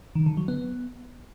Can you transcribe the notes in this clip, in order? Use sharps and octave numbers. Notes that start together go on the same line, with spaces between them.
D#3
D3
F#3
B3